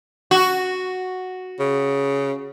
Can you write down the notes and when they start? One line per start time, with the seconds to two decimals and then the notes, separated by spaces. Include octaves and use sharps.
0.31 F#4
1.60 C#3